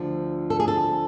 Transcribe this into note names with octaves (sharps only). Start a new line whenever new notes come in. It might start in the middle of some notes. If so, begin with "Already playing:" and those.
Already playing: D2 D3 F3
A4
G#4
A4